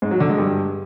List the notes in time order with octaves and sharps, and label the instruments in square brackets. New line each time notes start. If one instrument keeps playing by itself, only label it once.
[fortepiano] G#2
F#3
D3
G#3
G2